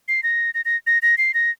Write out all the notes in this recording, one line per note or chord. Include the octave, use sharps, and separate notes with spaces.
C7
A#6
A#6
A#6
A#6
A#6
C7
A#6